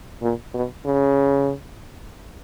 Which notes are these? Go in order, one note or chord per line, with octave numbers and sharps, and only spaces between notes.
A#2
B2
C#3